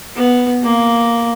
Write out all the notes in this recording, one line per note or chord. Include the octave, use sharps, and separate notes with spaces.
B3
A#3